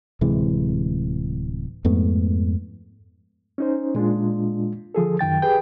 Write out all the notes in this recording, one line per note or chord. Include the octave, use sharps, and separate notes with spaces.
D1 C3 E3 G#3
F2 G#2 A3 B3
C#4 D#4 C5
A#2 G#3 D4 F4
D3 F3 G#4 A4
F#2 D#3 G5 A6
G4 G#4 B4 G5